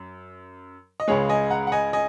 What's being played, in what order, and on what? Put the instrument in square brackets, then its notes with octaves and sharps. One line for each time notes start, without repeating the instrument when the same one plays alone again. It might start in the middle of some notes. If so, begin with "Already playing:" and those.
Already playing: [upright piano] F#2
D#5
C#2 C#3 G#3 G#4 C#5
D#5 G#5
F#5 A#5
F#5
D#5 G#5
D#5 G#5